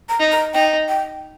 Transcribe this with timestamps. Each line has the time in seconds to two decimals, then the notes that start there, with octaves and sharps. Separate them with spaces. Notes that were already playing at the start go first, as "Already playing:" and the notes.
0.09 A#5
0.20 D#4
0.32 A#5
0.54 D#4 G5
0.89 G5